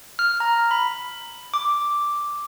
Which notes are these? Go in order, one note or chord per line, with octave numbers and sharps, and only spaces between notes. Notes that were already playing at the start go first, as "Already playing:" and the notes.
F6
A#5
B5
D6